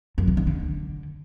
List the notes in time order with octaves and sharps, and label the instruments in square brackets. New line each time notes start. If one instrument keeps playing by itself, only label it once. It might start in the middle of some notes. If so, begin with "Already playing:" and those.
[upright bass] F#2
C3
D#3
D3